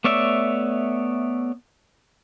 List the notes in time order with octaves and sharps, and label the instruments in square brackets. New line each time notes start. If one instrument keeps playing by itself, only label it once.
[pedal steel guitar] A3 B3 C#5 D5 E5